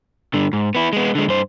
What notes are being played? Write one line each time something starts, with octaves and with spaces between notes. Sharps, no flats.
G2 D3
G#2
B3 E4
G#3 B3
D3 G#3
G2 C5